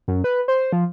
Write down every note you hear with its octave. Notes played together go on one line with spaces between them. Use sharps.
F#2
B4
C5
F3